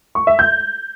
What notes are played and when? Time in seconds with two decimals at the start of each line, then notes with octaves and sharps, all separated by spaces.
0.15 C#6
0.27 E5
0.39 G6